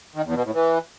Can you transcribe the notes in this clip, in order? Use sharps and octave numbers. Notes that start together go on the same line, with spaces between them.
D#3
E2
B2
A2
E3